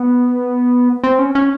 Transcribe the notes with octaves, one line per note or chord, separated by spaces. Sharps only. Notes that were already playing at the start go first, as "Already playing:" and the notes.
Already playing: B3
C4
C#4
C#4